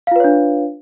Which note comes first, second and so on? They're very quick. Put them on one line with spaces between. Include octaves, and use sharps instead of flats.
F5 F4 B4 C#5 D4